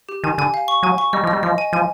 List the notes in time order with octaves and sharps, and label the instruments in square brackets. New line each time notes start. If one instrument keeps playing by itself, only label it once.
[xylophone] G4
[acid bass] D#3 [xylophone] G#5
[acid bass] D3 [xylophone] G#5
[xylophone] F5
C#6
[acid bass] F#3 [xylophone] G#5
[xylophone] C#6
[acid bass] G3 [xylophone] D#5
[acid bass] F3
[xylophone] D#5
[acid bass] G3
[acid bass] F3 [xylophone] D#5
[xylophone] G#5
[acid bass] F3 [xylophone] G#5